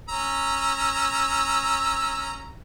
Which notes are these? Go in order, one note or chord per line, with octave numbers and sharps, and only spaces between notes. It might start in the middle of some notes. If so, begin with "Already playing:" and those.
C#4 A#5 E6